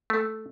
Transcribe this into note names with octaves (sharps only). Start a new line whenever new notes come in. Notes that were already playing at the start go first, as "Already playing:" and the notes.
A3